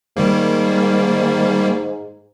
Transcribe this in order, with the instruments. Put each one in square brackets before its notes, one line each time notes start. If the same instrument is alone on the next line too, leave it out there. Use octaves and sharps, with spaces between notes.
[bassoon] G#2 [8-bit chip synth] D#3 G3 A#3